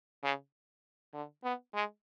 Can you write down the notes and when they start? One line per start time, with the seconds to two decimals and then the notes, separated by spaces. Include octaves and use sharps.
0.23 C#3
1.14 D3
1.44 B3
1.74 G#3